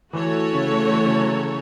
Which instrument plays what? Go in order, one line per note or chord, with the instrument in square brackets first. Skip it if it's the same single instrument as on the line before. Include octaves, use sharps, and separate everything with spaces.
[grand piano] E3 [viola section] A3 F#4 A4 C#5
[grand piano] C#3
E3
C#3
F#3
E3